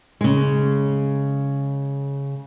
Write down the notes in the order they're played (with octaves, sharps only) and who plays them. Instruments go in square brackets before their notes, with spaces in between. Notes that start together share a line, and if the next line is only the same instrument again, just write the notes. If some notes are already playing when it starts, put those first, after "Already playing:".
[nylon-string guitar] C#3 G#3